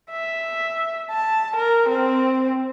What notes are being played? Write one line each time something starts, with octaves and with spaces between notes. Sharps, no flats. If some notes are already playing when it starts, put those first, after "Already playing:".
E5
A5
A#4
C4